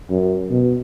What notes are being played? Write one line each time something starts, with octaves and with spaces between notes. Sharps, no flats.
F#2
B2